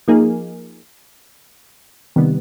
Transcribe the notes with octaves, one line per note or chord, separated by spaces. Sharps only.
F3 A#3 D#4 G#4
C3 D#3 G3 B3